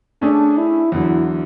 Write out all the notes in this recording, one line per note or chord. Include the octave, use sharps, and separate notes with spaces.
A3 C#4 D4 G#4
E4
E2 D3 F#3 E4